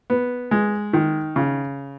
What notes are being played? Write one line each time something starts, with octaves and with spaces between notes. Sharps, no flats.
B3
G#3
D#3
C#3